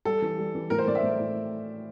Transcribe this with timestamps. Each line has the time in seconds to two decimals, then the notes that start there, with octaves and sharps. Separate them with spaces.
0.05 G3 A4
0.22 E3
0.38 G3
0.55 E3
0.70 A2 A#4
0.78 C5
0.87 A2 D5
0.95 E5
1.03 A2
1.20 A2